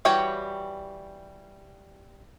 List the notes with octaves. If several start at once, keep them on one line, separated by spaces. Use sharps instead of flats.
E3 G3 F#4 C#5 G5